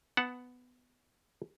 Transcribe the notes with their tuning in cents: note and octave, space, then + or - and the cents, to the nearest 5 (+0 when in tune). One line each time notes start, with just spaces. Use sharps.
B3 +10 F#5 +0 A5 +0